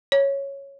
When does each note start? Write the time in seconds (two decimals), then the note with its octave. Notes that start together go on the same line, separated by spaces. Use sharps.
0.12 C#5